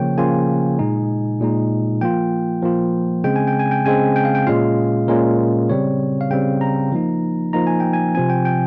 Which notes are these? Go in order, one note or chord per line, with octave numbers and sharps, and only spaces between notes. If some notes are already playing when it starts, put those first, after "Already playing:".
Already playing: C#3 F3 A#3 F4 C#5 G5
C#3 F3 A#3 F4 G#5
A#2 G#3 D#4
A#2 G#3 D#4
F3 A#3 F4 G5
F3 A#3 F4
C#3 G#3 C4 G5
G#5
G5
G#5
G5
C#3 G#3 C4 G#5
G5
F5
G5
A#2 G#3 C#4 F4 F5
A#2 G#3 C#4 F4 A#4
C#3 G3 C4 C#5
F5
C#3 G3 C4 G5
A#5
F3 A#3 D#4
F3 A#3 D#4 A#5
G#5
G5
G#5
C3 F3 C4 G#5
G5
G5